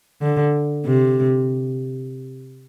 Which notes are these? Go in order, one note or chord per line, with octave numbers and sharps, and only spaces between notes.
D3
C3